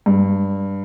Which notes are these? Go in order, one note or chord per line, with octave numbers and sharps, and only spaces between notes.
G2